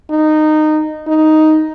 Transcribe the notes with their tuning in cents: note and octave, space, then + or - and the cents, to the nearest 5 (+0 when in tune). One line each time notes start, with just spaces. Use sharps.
D#4 -15
D#4 +5